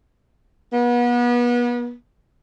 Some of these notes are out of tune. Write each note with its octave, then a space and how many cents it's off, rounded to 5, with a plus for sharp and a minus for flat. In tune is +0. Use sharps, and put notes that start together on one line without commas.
B3 -35